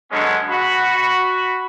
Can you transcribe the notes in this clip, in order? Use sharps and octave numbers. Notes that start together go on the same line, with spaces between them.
D3 F#3 G#3 B3 C#4
F#4 B5